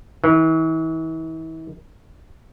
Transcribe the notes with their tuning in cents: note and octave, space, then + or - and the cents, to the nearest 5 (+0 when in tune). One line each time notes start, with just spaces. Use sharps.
E3 -40